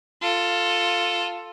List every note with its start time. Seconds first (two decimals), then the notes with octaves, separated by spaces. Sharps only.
0.22 F4 A4